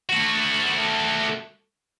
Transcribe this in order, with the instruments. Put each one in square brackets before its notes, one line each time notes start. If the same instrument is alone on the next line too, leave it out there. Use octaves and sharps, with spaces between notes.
[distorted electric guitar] A3 F#4